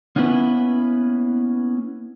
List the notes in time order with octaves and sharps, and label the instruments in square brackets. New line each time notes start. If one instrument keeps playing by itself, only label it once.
[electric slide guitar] A#3 B3 C#4 E4 B4